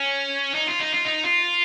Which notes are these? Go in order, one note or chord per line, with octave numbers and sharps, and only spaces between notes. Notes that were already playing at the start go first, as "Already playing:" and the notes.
Already playing: C#4
D#4
F4
D#4
F4
D#4
F4